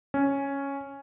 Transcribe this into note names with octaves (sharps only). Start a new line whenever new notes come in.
C#4